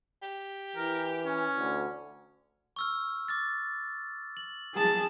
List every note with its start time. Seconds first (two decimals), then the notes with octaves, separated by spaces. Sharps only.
0.23 G4
0.76 E3 A#4
1.26 C#4
1.56 D2
2.76 C#6 E6 F6
3.28 D6 F6 A6
4.37 F#7
4.75 G#4 A5